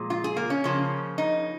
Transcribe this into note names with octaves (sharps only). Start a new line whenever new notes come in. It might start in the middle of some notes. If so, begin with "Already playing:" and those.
Already playing: A#2 F3 G#3
F4
G#4
A#3
C#4
C#3 F3 A#3
D#4